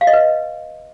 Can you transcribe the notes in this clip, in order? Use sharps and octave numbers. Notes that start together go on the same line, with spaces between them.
F5
D#5
B4